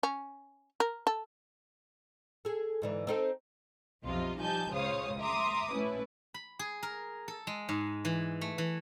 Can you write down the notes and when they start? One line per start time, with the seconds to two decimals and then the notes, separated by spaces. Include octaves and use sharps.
0.03 C#4
0.80 A#4
1.07 A4
2.45 G#4 A4
2.82 G#2 D3 E3
3.07 C4 D#4 A4
4.04 B1 F2 C3 F4 D#5
4.39 F3 G3 D#4 G#5 A5 G6
4.73 C#2 C#3 C5 C#5 F5 D#6
5.20 E5 A#5 C6 D6 D#6
5.73 A3 C#4 E4 B4
6.34 B5
6.59 G#4
6.83 A#4
7.28 A4
7.47 G#3
7.69 G#2
8.05 E3
8.41 A3
8.58 E3